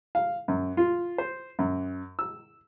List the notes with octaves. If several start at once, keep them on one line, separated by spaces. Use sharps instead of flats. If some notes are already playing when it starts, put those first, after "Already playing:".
F5
F#2
F4
C5
F#2
E6